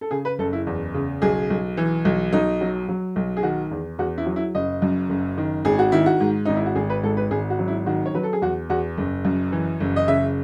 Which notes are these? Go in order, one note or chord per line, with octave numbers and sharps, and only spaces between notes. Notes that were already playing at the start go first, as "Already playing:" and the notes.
A4
C#3 G#4
B4
F#1 A4
E4
E2
C#3
B1 G#4
B1
E3
B1
B1 D#4
F#3
F#3
B1
G#4
D#3 F#4
E2
E2 F#4
E4
F#3
E4
F#1 D#5
F#2
F#1
D#3
G#1 G#4
F#4
D#3 E4
F#4
G#2
G#1 D#4
E4
F#4
G#1 G#4
B4
G#2 A4
B4
G#1 G#4
F#4
F#3
E4
D#3 F#4
C#5
F#3 B4
A4
G#4
E2 F#4
E2 F#4
F#1
F#2
E3
F#1
D#5
C#3 E5